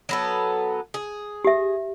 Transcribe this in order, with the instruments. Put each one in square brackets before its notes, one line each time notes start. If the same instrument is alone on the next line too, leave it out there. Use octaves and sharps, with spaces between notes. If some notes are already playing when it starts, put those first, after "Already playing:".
[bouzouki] F#3 B3 A4
G#4
[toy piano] G4 E5